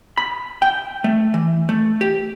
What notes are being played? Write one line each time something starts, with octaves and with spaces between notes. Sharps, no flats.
B5
G5
A3
E3
A3
G4